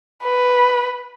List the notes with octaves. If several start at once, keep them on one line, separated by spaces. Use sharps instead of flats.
B4